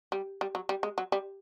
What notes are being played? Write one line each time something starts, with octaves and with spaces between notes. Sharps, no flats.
G3
G3
F#3
G3
G#3
F#3
G3